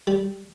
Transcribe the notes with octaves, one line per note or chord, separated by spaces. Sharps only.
G3